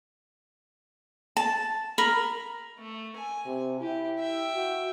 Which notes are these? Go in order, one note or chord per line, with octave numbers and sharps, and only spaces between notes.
A5
A#4 B5
A3
G#5
C3
E4 G4
E5 G5
F#4